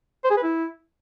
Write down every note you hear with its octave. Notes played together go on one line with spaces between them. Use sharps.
C5
G#4
B4
E4